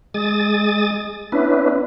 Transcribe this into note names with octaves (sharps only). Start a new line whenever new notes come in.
G#3 D#6 A6
B3 C#4 D4 E4 B4